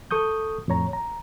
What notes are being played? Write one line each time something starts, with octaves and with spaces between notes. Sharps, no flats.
A4 C#6 D#6 G6
F2 A2 C#5 A#5
A#5